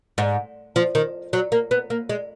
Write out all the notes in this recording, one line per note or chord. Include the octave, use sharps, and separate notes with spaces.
G#2
F3
D#3
F#3
A#3
B3
A#3
G#3